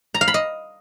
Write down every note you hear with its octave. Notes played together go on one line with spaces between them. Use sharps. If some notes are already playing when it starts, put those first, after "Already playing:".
A#5
F5
B5
D#5